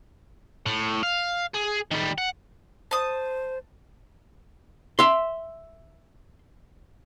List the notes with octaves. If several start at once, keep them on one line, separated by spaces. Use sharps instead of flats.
A2
F5
G#4
D#3 G3
F#5
C5 A5 D#6
E5 C6